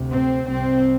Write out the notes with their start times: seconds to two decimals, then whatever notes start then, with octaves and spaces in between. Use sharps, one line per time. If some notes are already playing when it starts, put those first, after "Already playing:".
Already playing: D2 C3
0.11 C4
0.49 C2 C3 C4